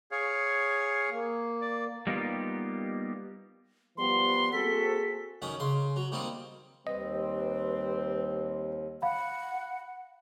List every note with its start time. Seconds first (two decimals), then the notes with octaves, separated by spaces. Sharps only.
0.11 G#4 C#5 F5
1.09 A#3
1.61 D5
2.07 G3 A#3 B3 D#4 F4 G4
3.97 F3 G3 B3 C6
4.53 A#3 C4 F#4 G#4 A4 B6
5.42 F#2 D#3 C#4 F#5
5.60 C#3 C6
5.96 F#3
6.12 D#3 G3 A#3 C4 D#4
6.87 D#2 G3 C4 B4 D#5
9.02 F5 F#5 B5